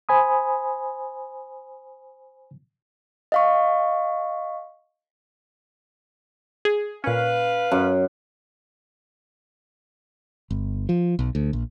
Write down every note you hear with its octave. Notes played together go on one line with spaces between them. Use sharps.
C5 G#5 B5 D#6
D#5 F5 C#6
G#4
A#2 C#4 B4 F5
F#2
G1
F3
B1
D2
A#1